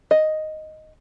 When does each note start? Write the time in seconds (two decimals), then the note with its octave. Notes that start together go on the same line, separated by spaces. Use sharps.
0.11 D#5